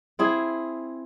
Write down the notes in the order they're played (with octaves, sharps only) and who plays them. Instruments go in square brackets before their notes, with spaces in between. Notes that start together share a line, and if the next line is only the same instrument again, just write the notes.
[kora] C4 E4 G#4